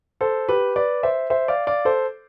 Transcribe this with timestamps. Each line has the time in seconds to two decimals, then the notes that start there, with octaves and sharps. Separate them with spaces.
0.21 A4 C5
0.49 G4 B4
0.76 B4 D5
1.03 C5 E5
1.30 C5 E5
1.48 D5 F5
1.67 D5 F5
1.85 A4 C5